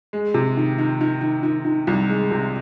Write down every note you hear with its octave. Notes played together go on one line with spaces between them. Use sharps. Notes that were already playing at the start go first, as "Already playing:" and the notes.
G#3
C3
D#3
D#3
D#3
D#3
D#3
D#3
C2
G#3
C3